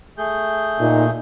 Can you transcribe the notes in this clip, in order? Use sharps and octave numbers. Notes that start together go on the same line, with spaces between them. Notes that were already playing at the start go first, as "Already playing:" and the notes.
A3 G#4 G6
A#2 D#4